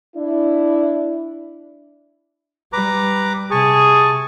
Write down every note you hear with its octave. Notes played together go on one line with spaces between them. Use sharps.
D4 E4
G3 B4 A#5 D6
C3 G#4 A5 C#6